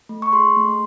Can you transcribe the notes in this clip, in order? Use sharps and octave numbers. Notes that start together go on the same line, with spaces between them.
A3
C#6
G#4 C6
A3